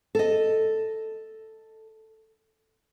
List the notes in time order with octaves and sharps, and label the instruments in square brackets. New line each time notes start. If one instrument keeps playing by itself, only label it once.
[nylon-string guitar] A4 D#5